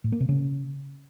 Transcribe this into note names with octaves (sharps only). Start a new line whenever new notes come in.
A2
A#3
C3
C#3